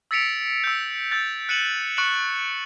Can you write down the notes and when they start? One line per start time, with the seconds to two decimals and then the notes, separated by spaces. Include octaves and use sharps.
0.11 E6 A6 B6 C#7 D7 F7
0.64 E6 G6
1.11 E6 G6 A6
1.49 F#6 C#7 D#7 E7 F#7
1.97 C#6 F#6 C#7 E7 F#7